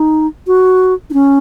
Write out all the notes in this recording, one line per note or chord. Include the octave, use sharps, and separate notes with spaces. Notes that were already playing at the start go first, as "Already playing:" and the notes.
Already playing: D#4
F#4
D#4
C#4